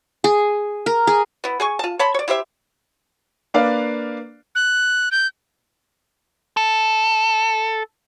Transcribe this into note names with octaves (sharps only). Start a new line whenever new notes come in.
G#4
A#4
G#4
B3 E4
G#4 G#5 C#6
F4 A5
C#5 A5 B5 C6
C#5 D5
E4 G4 C5 E5
A#3 D4 B4 D5 F5
F#6
G6
A4